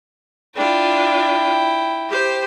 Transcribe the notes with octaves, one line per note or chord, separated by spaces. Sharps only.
D4 E4 F4 G5
G4 C5